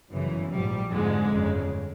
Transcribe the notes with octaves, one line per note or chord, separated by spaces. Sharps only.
G1 F#2 C#3 E3
A#1 G#2 F3 G3
F2 G#2 D3 F3 G#3
G1 F2 C#3